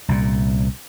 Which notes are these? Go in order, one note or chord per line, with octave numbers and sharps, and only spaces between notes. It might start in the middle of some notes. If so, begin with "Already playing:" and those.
C2 A#2